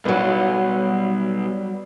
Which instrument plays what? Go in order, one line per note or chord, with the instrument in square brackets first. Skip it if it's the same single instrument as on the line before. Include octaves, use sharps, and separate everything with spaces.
[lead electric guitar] B1 [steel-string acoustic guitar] F#3 B3 [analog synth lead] G3